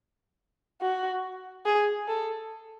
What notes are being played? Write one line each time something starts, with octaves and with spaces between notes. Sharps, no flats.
F#4
G#4
A4